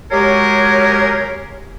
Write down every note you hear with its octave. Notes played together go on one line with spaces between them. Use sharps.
F#3 G#3 G4 G#4 A#4 C#5